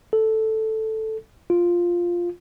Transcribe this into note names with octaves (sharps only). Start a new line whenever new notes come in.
A4
F4